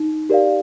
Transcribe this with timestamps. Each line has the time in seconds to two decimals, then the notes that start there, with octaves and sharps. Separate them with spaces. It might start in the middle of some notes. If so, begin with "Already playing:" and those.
Already playing: D#4
0.29 G4 A#4 D5 F5